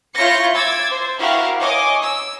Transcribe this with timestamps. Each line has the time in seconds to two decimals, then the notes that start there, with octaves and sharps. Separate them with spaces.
0.15 E4 F4 C#5 G6 A#6 C#7
0.53 D6 E6 G#6 A6
0.89 C5
1.18 E4 F#4 G4 A#4 F5 F#5
1.60 C#5 D#5 G#5 D6
2.03 E6